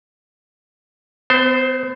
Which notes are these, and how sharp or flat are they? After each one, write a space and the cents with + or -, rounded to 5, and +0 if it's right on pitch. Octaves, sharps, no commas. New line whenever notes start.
B3 +45 C5 +0